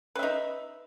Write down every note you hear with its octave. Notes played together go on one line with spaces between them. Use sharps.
D#4 B4 E5